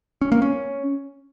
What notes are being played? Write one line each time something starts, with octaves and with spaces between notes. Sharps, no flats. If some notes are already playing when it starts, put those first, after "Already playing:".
C#4
A#3
C#4